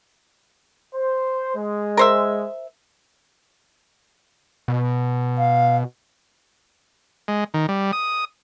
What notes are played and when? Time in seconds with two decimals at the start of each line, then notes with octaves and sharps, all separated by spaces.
0.94 C5
1.56 G#3
1.97 A#4 C5 E5
4.68 B2
5.38 F5
7.28 G#3
7.54 D#3
7.69 G3
7.92 D#6